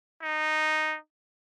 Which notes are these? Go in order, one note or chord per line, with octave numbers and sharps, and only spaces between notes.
D#4